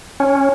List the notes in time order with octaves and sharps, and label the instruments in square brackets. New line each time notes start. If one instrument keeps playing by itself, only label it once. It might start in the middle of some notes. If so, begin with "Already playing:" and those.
[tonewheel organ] C#4